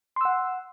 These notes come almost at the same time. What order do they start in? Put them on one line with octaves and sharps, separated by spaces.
C6 E6 F#5